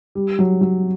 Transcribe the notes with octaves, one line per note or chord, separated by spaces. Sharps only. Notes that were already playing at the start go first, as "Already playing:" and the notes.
G3
F#3
F#3